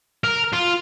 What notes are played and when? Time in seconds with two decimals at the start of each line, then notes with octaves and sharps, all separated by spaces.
0.24 A#4
0.53 F4